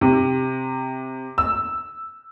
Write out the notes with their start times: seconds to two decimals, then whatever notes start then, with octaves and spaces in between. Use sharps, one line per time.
0.01 C3
1.38 E6